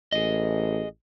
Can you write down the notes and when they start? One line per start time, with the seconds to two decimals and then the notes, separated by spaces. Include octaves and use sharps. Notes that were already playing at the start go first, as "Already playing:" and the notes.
0.12 A1 G#4 D#5